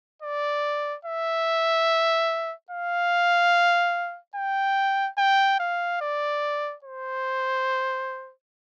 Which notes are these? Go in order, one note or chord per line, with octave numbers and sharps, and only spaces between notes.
D5
E5
F5
G5
G5
F5
D5
C5